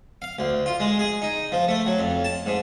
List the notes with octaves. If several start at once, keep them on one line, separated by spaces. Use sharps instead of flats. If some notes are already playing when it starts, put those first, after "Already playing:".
F5
D2
F4
G#3
G#4
D#4
F3
A3
F#3
F2
A5
G#2